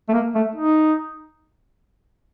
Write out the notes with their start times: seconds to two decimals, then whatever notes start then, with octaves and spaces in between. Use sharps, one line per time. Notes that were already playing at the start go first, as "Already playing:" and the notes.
0.09 A3
0.13 A#3
0.35 A3
0.56 D#4